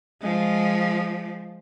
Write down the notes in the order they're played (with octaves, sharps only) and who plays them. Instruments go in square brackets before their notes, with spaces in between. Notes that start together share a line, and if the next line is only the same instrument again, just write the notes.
[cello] F3 G#3